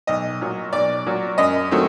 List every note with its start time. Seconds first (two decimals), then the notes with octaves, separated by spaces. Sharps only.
0.07 B1 D#5
0.41 A#2 F#3
0.73 B1 D5
1.06 A#2 F#3
1.38 F#2 D#5
1.71 D#3 F#3 A3 C4